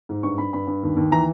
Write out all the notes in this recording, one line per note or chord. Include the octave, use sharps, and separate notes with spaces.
G#2
G2 C#6
G2 B5
G2 B5
G2
D#2
D#2
E3 A#5